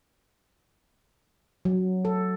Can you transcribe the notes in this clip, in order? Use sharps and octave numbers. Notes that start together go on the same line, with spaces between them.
F#3
A4